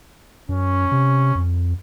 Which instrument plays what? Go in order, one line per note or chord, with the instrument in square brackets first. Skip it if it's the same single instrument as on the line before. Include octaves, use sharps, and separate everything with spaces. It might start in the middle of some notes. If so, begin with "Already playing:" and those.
[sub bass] F#2 [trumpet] C#4
[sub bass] C3
F2